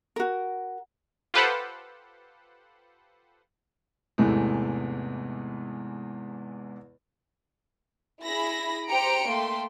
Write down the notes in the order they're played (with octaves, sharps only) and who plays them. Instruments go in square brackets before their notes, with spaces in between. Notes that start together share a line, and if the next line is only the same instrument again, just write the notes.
[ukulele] F#4 A#4
[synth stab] F4 G4 A4 B4 C5 F#5
[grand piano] E2 G#2 C3 E3 G#3 A3
[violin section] E4 G#4 B5 A#6
G4 C5 G5 A#5 C#7 D7
A3 A#3 G5 C6